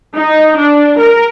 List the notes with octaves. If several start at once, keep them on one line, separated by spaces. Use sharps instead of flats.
D#4
D4
A#4